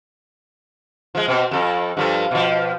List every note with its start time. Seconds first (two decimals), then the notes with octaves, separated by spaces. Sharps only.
1.15 F3 G#3
1.28 B2 C4
1.51 F2 A4
1.97 G2 F3 A4
2.31 B2 F3